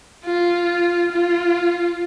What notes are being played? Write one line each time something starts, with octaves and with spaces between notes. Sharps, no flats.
F4
F4